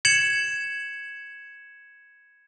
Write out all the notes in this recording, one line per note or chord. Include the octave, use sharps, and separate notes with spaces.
G#6 C#7 E7 F#7